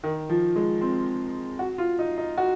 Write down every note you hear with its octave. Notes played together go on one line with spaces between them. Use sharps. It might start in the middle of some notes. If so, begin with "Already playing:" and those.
D#3
F3
G#3
C4
F#4
F4
D#4
D#4
F#4